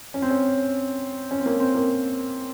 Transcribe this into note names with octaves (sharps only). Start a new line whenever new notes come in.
C#4
C4
C#4
C#4
C4
A#3
C4
A#3